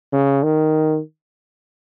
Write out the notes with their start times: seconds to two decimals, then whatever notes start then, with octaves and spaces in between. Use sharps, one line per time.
0.12 C#3
0.43 D#3